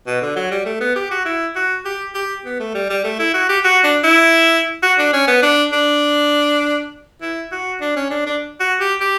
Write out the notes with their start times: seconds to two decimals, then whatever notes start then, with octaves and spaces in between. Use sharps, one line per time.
0.07 B2
0.22 D3
0.36 F#3
0.51 G3
0.65 A3
0.81 B3
0.96 G4
1.11 F#4
1.25 E4
1.55 F#4
1.85 G4
2.14 G4
2.45 B3
2.60 A3
2.74 G3
2.90 G3
3.04 A3
3.19 E4
3.34 F#4
3.49 G4
3.64 F#4
3.84 D4
4.04 E4
4.83 F#4
4.98 D4
5.13 C#4
5.28 B3
5.43 D4
5.72 D4
7.22 E4
7.52 F#4
7.81 D4
7.96 C#4
8.11 D4
8.26 D4
8.60 F#4
8.80 G4
9.00 G4